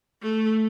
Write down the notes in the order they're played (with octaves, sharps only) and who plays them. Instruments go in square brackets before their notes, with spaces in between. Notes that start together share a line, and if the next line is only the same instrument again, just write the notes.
[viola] A3